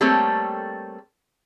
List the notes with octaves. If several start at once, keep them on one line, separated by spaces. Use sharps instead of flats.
G3 A3 A#3 C4 A4 C#5